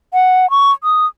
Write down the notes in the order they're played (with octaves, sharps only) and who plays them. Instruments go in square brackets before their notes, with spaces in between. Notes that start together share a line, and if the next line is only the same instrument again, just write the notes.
[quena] F#5
C#6
D#6